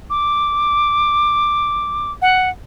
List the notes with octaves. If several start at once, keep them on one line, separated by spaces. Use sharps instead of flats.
D6
F#5